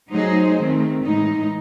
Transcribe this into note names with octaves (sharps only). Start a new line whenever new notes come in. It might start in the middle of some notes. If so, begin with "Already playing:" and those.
F#3 A3 D#4 G#4 C5
D#3 A3 C4
A2 E3 G#3 D#4